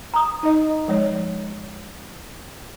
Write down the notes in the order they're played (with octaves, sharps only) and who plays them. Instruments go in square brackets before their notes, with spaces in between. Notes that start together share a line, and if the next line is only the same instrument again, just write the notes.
[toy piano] A#5 D#6
[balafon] D#4 D#5
F3 G#3 C#5